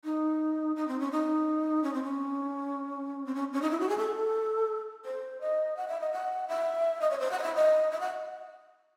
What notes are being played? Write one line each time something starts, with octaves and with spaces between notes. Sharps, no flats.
D#4
D#4
C4
C#4
D#4
C#4
C4
C#4
C4
C#4
C#4
D#4
E4
F#4
G#4
A4
C5
D#5
F#5
E5
D#5
F#5
E5
D#5
C#5
C5
F#5
D#5
E5
D#5
E5
F#5